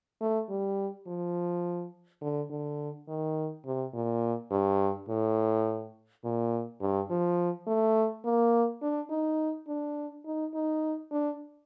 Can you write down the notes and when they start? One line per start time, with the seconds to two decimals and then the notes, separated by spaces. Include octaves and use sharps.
0.21 A3
0.49 G3
1.07 F3
2.21 D3
2.50 D3
3.08 D#3
3.66 C3
3.93 A#2
4.51 G2
5.09 A2
6.24 A#2
6.81 G2
7.10 F3
7.67 A3
8.25 A#3
8.82 D4
9.10 D#4
9.68 D4
10.25 D#4
10.54 D#4
11.12 D4